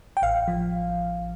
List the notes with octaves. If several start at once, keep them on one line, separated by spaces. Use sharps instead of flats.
G5
A1 F5
F3